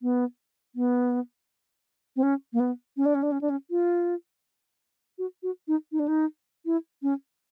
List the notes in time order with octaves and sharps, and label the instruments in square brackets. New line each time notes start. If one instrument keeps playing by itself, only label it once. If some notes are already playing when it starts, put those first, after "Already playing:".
[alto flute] B3
B3
C4
C#4
A#3
B3
C#4
D4
C#4
D4
C#4
D4
C#4
F4
F#4
F#4
D#4
D#4
D4
D#4
E4
C#4